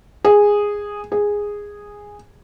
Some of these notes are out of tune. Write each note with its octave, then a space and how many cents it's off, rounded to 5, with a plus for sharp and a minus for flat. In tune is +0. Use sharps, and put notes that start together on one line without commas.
G#4 -10
G#4 -10